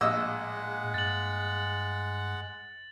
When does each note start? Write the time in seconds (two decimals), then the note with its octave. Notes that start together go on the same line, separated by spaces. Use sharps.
0.01 A#1 A2 G#3 D#5 F#5 E6
0.94 G2 A6 F#7